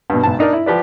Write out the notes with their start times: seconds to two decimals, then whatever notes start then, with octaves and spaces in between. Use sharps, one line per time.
0.10 G2 B2
0.23 B1 G#2 A5
0.39 D4 D#4 A#4 D5
0.53 E4
0.66 F3 G4 B4 D5